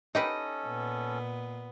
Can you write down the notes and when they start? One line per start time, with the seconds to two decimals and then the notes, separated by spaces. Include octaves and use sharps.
0.15 C#4 D#4 G4 A4 B4 D#5
0.67 A#2 B3